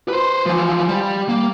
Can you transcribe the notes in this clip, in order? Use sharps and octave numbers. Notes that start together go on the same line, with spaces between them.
B4 C5
E3 F3
G3
A#3